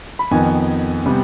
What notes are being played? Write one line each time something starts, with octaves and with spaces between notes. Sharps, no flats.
B5
F2 D#3 B3 G#5
C3 G3 B3